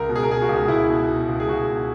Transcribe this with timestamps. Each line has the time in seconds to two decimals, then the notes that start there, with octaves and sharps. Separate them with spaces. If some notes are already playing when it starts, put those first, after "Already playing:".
Already playing: C#2 A#4
0.09 B2
0.16 G#4
0.23 A#4
0.29 B2 G#4
0.42 F#4
0.49 C#2
0.68 C#2 E4
0.89 B2
1.09 B2
1.29 C#2
1.40 G#4
1.48 C#2 F#4
1.69 B2